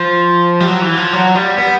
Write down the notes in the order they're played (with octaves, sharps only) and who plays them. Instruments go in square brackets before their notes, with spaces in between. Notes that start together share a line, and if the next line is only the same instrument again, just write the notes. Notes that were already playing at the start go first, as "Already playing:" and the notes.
Already playing: [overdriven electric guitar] F3
G3
F#3
E3
F3
F#3
G3
B3